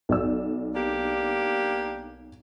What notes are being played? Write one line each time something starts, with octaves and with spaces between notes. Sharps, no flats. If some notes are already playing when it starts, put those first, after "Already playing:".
B1 D5 E6
A#3 D4 G4